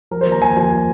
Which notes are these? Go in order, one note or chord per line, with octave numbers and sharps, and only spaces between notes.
F3 A#4
C5
D#2
A#5
D#2 G#5
F3 G#5